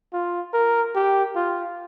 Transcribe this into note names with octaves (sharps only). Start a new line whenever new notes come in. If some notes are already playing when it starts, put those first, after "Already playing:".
F4
A#4
G4
F4